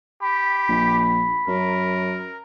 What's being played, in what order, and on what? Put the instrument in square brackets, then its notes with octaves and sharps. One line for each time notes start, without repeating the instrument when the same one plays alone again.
[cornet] G4 [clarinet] B5
[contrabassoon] A#1
[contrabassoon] F#2 [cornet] A#4